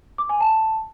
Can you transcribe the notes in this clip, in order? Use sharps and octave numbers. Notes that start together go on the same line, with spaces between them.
D6
G#5
A5